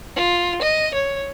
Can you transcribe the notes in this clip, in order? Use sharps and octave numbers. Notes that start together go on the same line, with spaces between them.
F4
D#5
C#5